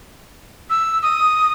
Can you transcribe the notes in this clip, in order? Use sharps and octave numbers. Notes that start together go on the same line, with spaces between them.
E6
D#6